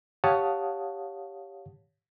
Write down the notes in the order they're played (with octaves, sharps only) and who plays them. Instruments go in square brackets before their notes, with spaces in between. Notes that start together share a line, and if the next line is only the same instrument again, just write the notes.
[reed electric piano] G4 C#5 F5 F#5 A5 D#6